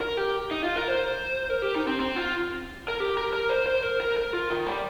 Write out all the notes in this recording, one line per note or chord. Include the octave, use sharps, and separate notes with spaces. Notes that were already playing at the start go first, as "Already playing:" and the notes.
A#4
G4
D#4
F4
A#4
C5
A#4
G4
D#4
C4
C4
F4
A#4
G4
A#4
A#4
C5
C5
A#4
A#4
A#4
F4
D#3
G3